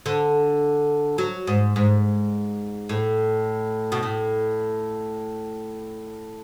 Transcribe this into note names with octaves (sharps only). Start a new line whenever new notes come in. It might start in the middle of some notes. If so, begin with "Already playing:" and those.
D3
F#3
G#2
G#2
A2
B2
A2